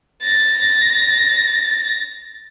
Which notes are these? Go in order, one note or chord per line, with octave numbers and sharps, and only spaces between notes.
A6 A#6